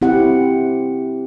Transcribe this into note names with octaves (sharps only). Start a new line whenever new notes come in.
C4 E4 G4 F#5